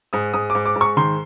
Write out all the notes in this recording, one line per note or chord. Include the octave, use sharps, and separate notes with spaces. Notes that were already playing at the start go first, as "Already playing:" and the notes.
G#2 D#6
G#2 D#6
D6
G#2
D6
G#2
C#6
D#3 C6